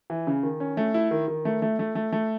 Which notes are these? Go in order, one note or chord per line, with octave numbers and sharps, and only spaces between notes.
E3
C#3
D#3
C#4
A3
E4
D#3
D#3
A3
A3
A3
A3
A3